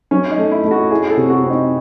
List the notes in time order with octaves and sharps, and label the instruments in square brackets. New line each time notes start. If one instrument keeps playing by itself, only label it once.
[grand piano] F#3 [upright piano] C#4
[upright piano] D#4
[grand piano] A3
[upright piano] E4
[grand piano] A3
[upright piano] F#4
[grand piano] E4 [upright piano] G#4
[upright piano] A4
[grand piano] C3
[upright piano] F#4
[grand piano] C4
[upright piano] D#4